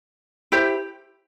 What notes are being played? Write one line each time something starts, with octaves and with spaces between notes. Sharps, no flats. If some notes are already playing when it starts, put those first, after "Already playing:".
E4 G4 C5